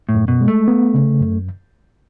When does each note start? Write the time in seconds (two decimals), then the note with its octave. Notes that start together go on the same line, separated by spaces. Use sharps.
0.09 A2
0.15 F#2
0.28 B2
0.41 G#3
0.48 A3
0.68 B3
0.94 C#3
1.20 F#2